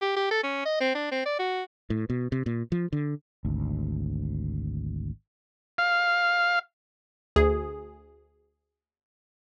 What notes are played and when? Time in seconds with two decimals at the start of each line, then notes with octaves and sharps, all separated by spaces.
0.02 G4
0.16 G4
0.31 A4
0.44 C#4
0.65 D#5
0.80 C4
0.95 D4
1.12 C4
1.25 D5
1.39 F#4
1.90 A2
2.10 B2
2.32 C3
2.46 A#2
2.72 F3
2.93 D3
3.45 G#1 D2
5.78 F5
7.36 D2 G#4